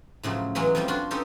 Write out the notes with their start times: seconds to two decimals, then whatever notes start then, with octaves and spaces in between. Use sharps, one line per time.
0.23 A2 C#3 F3 F#3
0.55 E3 F#3 G#3 B3 C#4 F#4
0.75 F2 F3 G3 G5 A5
0.88 D4 F4 F#4 G5 C6
1.11 C4 C#4 D#4 G4 A4